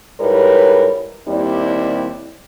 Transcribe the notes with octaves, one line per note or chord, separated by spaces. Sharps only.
G#2 G3 E4 A#4 B4 C#5
D#2 G3 C4 E4 D5